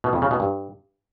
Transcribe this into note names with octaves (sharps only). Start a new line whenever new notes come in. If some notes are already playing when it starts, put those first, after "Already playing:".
B2
F2
C#3
B2
G2